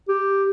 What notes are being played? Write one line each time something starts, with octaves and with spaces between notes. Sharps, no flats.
G4